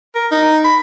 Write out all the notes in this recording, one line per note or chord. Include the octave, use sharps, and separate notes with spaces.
A#4
D#4
B5